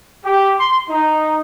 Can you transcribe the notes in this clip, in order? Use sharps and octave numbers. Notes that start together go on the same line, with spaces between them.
G4
C6
D#4